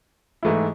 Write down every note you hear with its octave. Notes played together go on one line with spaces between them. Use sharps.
G#2 E3 A3 E4